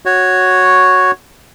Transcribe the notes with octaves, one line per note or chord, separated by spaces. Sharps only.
F#4 C#5